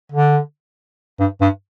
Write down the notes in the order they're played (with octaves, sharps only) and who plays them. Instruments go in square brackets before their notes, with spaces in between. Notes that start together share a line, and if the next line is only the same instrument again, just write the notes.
[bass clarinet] D3
G2
G2